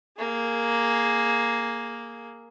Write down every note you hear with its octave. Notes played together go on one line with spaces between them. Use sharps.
A#3 G#4